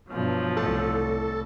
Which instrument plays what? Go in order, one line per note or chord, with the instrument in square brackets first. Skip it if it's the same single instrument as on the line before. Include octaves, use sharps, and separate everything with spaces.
[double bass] G2 B2 [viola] F3 F#3
[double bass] C2 A2 [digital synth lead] A4